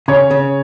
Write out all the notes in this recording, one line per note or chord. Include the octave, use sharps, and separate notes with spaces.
C#3 C#5
C#3